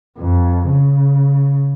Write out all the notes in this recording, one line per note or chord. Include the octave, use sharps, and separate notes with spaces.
F2
C#3